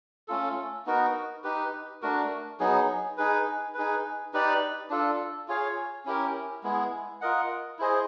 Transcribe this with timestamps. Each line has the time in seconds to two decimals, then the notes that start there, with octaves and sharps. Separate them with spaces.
0.28 A3 C#4 F4 A4
0.86 B3 D#4 F#4 A#4
1.44 D#4 G4 B4
2.02 A3 D4 F#4 A#4
2.60 F#3 B3 D#4 G#4
3.18 D#4 G#4 B4
3.74 D#4 G#4 B4
4.33 D#4 G4 B4 D5
4.90 D4 F4 A4
5.48 F4 G#4 C#5 F5
6.05 C#4 E4 G4 A#4
6.63 G#3 B3 E4 G#4
7.21 F4 A#4 D#5 F#5
7.79 E4 G#4 C5 D#5